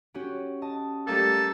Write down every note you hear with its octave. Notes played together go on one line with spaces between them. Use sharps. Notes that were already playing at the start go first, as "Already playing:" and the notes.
C#4 F#4 G4
D#5 A5
G3 A3 A#3 A4